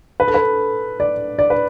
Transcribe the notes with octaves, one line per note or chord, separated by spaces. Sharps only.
B4
A4
B4
D5
D5
B4